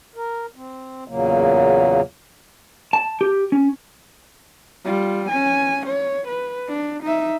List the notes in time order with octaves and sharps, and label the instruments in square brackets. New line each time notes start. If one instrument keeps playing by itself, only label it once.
[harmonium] A#4
C4
E2 A#2 C#3 F#3 A#3
[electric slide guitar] A5
G4
C#4
[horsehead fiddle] G3 F4
C#4 G#5
C#5
B4
D4
D#4 E5